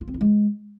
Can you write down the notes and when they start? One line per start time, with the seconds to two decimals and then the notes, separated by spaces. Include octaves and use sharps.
0.01 F4
0.08 C4
0.14 E4
0.21 G#3